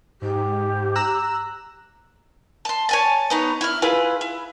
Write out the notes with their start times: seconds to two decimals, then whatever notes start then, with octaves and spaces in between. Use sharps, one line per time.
0.22 G#2 G4
0.95 A#5 E6 F#6
2.65 A5 C6
2.89 C#5 G#5 A5
3.30 B3 D#4 C#5
3.61 E4 F6
3.82 E4 F4 G#4 B4
4.21 E4